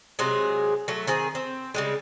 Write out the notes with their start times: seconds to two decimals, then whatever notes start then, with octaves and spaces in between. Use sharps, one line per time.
0.19 C3 F#3 G#3 G#4
0.88 F#3 A3
1.07 D#3 C4 G#4
1.35 C4
1.74 C#3 G3 G#3